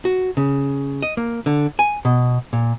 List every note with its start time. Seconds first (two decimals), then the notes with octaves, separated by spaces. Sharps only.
0.05 F#4
0.37 C#3
1.03 D#5
1.17 A#3
1.46 D3
1.79 G#5
2.05 B2
2.53 A#2